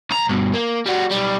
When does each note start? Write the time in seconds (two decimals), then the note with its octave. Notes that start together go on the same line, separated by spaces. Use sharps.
0.11 B1 A#5
0.29 G2 B2
0.54 A#3
0.86 G3 F#4
1.11 B1 G3